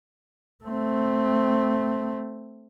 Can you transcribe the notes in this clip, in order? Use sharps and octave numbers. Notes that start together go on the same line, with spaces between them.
A3 C4